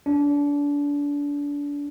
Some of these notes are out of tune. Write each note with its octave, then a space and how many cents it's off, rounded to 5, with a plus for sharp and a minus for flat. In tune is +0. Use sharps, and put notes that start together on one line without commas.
D4 -30